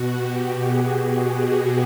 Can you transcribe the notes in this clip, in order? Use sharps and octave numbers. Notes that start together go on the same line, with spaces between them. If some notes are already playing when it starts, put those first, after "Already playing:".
Already playing: B2 F#4
G4
G#4
G#4
G#4